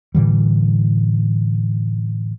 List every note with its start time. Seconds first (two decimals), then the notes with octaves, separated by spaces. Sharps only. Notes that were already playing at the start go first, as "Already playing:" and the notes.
0.15 A2 D3 E3 G3